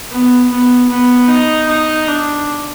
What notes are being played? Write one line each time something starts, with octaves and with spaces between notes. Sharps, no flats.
B3
B3
B3
D#4
D#4
D4